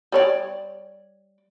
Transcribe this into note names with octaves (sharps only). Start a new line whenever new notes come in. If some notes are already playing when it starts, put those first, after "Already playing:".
G3 C#5 D5